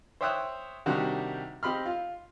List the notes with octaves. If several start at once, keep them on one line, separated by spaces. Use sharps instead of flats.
C5 C#5 E5 G5 D#6 F#6
C3 D#3 G3 D4 F#4 G4
C4 G4 D#5 B5 C6 F6
F4